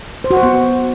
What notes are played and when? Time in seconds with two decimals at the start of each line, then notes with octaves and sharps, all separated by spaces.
0.24 C5
0.31 F#4
0.37 C5
0.43 B3